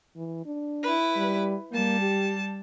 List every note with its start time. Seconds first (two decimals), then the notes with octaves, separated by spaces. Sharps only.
0.16 E3
0.46 D4
0.84 E4 B4
1.16 G3
1.72 G3 A#3 A5
2.01 G4